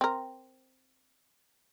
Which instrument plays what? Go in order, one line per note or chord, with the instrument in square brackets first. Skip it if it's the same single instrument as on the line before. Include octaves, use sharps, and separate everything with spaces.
[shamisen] C4 A#4